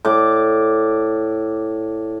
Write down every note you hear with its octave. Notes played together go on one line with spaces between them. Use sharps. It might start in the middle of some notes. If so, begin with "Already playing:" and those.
A2 D5 D6